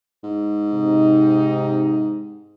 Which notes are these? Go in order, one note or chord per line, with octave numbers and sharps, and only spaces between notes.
G#2
C3 D#4